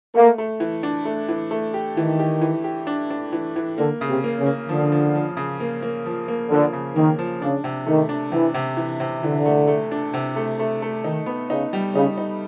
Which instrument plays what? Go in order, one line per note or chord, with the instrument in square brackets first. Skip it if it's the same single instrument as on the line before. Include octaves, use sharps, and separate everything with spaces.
[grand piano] A3 [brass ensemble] A#3
[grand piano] A3
E3
D4
A3
E3
A3
G4
[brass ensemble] D#3 [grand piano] E3
[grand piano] G4
E3
G4
D4
D4
E3
E3
[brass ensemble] D3 [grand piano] A#3
[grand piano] C#3
[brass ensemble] C3
[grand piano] A#3
[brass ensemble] C#3
[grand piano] A#3
[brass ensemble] D3 [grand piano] F3
[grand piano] F3
F3
C#3
A#3
A#3
F3
A#3
[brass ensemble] D3 [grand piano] F3
[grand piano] C#3
[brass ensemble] D#3 [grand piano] A#3
[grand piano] F3
[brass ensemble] C#3 [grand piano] D4
[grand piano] C3
[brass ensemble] D#3 [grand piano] A3
[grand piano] D4
[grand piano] C3 [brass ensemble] E3
[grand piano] C3
E3
C3
[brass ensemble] D3 [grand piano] E3
[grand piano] A3
A3
D4
C3
A3
A3
A3
[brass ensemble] D#3 [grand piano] D#4
[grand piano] B3
[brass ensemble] C#3 [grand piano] D#4
[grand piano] G3
[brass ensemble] C#3 [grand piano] D#4
[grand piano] D#4